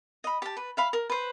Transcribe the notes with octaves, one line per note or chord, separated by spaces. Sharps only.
D#5 B5
G4 A5
B4
E5 F5 B5
A#4
B4 C5